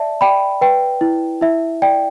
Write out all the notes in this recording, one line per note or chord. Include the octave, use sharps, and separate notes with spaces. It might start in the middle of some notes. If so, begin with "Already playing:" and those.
Already playing: D5 E5 A5
D5 G5 B5
B4 G5
E4
E4 E5
D5 G5